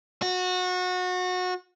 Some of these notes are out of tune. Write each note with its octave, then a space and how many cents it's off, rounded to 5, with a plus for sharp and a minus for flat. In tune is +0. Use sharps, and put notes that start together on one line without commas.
F#4 -25